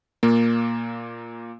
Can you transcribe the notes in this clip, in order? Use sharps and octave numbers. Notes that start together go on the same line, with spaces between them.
A#2 A#3